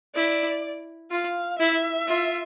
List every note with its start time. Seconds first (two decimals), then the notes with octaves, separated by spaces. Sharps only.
0.15 E4 D5
1.11 F4 F5
1.59 E4 E5
2.07 F4